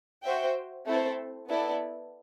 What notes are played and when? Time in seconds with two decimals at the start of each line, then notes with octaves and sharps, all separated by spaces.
0.23 F#4 C5 E5 G5
0.86 A3 C4 E4 A4 C5
1.49 B3 E4 A4 D5